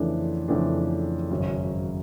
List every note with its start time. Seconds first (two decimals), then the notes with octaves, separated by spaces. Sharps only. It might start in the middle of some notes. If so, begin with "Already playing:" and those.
Already playing: F2 C#3 E3 A3 D4
0.48 F2 C#3 E3 A3 D4
1.30 G#1 F#2 C#3